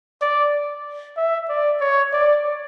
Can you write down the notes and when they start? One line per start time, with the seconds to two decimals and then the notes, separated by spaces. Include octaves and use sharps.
0.21 D5
1.17 E5
1.49 D5
1.81 C#5
2.13 D5